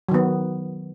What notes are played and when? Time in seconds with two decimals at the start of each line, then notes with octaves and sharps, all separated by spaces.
0.09 F#3
0.11 D#3
0.14 B3